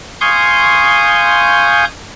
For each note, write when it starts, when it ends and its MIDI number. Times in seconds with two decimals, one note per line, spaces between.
0.21 1.85 77
0.21 1.85 80
0.21 1.85 84
0.21 1.85 85
0.21 1.85 87
0.21 1.85 91